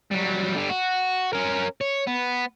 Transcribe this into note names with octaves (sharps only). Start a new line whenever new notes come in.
F#3 G3
D3 G3
F#4
C#4 A#4
C#5
B3